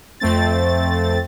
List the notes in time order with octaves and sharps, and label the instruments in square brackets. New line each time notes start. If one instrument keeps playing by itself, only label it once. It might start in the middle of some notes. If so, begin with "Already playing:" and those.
[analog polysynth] F2 A3 C4 A6